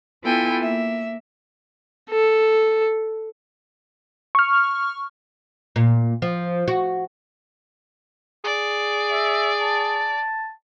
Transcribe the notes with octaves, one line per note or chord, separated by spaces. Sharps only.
B3 E4 F4 A4 G5 G#5
A#3 E5
A4
C#6 F6
A#2
F3
F#4
G#4 D5
E5
A5